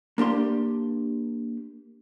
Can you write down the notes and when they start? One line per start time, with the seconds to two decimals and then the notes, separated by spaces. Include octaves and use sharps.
0.18 A#3 D4 G4 C6